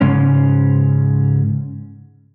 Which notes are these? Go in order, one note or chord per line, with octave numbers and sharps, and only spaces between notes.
G#2 C#3 G#3 C#4